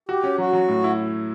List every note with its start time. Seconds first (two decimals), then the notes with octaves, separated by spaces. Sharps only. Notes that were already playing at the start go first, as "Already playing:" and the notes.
0.09 F#4 G4
0.24 C#4
0.38 F#3 F#4
0.53 F#3
0.68 A2
0.84 E4